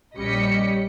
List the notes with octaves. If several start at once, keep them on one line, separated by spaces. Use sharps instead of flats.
A#1 G3 C#4 D#5 B6 C#7